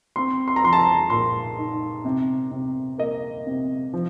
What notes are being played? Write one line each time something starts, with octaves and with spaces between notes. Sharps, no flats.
C4 C6
C6
A#5
F3 C6
A5
A#5
A#2 C6
D#4
C3
C3
A#3 D#5
C3
F3